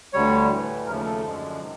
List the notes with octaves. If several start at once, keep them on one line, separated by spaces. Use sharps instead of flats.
D2 D3 G3 C#5
A2 E3 A3
D#2 C#3 F3 A3 A#4
A4
F#2 D3 F3 G#3
C3 D#3